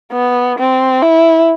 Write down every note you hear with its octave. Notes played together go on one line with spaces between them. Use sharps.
B3
C4
E4